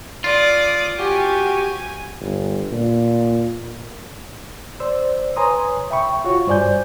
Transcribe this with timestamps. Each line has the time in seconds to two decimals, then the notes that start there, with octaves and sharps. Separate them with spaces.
0.24 F4 D5 D#6
0.99 C#4 F#4 G4 G#5
2.20 G1
2.72 A#2
4.80 C5 D5 E6
5.36 B4 C#5 G#5 A#5 C6 D#6
5.91 E5 G5 B5 C#6
6.24 F4 F#4 C#5 C#6
6.47 G2 C5 D5 G#5 G6